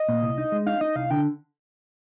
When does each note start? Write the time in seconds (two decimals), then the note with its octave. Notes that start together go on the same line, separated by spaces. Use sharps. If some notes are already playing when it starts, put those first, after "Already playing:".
Already playing: D#5
0.09 A#2
0.22 C2
0.38 D#4
0.52 G#3
0.66 D#4 F5
0.81 D#4 D#5
0.96 C2 F5
1.10 D3 G5